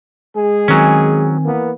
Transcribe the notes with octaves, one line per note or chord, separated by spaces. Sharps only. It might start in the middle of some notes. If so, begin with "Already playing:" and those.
G#3 G#4
D#3 F#3 C4 C#4 G#5
E3 A#3 B3